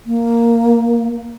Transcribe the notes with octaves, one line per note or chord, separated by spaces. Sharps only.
A#3